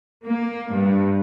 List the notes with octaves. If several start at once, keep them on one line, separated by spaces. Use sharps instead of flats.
A#3
G2